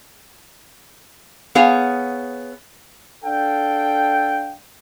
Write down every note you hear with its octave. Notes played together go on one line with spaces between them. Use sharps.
B3 G#4 C#5 F5
D4 A4 F5 G5